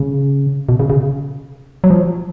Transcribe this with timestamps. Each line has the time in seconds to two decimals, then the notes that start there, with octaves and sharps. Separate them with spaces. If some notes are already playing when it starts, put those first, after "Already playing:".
Already playing: C#3
0.69 B2
0.80 C#3
0.90 C#3
1.84 F#3
1.90 F3